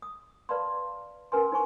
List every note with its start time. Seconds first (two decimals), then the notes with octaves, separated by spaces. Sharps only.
0.02 D#6
0.49 B4 D5 F5 A5 B5 C6
1.32 C#4 A#4 B4 G#5 C6
1.52 D#4 C5 G#5 C#6